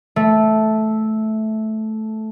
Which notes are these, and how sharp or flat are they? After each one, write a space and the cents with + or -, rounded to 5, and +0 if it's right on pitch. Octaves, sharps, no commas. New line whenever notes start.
A3 -10